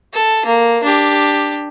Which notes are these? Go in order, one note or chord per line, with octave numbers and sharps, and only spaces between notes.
A4
A#3
D4 G4